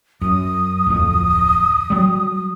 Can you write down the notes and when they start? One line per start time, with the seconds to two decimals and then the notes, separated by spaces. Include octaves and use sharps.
0.21 F#2 D#6
0.87 D1 F2
1.90 F#3 G3